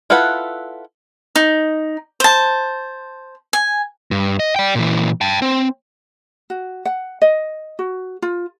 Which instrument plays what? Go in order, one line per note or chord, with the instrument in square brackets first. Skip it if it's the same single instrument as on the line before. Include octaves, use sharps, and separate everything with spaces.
[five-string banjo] E4 F4 A4 B4 F#5
[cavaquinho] D#4
C5 A5
G#5
[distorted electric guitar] G2
D#5
D5 G5
A#2 E3
G5 A5
C4
[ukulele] F#4
F#5
D#5
F#4
F4